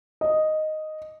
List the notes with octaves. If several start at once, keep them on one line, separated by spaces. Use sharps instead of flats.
D#5